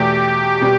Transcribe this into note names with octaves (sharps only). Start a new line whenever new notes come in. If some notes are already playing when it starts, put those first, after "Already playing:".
Already playing: E2 B2 A3 G4
B2 G3